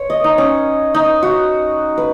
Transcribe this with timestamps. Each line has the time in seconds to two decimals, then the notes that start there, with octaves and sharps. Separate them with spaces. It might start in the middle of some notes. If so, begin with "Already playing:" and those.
Already playing: C#5
0.10 D#5
0.24 D#4
0.38 C#4
0.94 D#4
1.22 F#4
1.98 B4